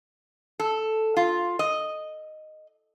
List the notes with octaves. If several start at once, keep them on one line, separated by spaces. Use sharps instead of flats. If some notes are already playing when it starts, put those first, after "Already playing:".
A4
F4
D#5